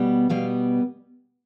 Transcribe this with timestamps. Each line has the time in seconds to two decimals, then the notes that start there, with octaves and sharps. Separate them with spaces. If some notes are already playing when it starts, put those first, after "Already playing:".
Already playing: B2 G3 B3
0.29 B2 G3 B3 F5